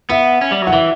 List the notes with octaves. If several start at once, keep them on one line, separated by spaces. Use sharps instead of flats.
B3 E5
C#4
G3
F#3
F#5
E3 E5